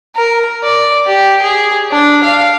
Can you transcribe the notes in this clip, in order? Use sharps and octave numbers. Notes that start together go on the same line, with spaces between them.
A#4
D5
G4
G#4
D4
F5